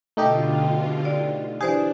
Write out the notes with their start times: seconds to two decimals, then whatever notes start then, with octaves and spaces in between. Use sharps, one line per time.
0.17 B2 D3 A3 D#4 F4 G4
1.05 D5
1.61 E3 D4 G4 G#4 C5 D5